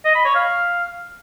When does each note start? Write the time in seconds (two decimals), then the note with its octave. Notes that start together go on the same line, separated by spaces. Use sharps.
0.05 D#5
0.15 B5
0.25 C#5
0.35 F5